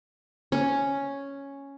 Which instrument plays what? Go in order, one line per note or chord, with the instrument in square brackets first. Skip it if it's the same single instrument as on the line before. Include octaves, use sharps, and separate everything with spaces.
[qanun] C#4